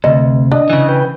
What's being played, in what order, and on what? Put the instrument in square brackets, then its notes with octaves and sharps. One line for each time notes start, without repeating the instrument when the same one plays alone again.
[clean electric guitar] D2 [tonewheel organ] C3 [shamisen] D#5
[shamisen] D4 [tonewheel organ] D#5
[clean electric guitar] C#3 E3
[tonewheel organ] B4 G5